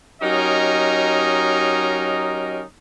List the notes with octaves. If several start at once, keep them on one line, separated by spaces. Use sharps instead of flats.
F#3 C#4 D#4 G4 A#4 D#5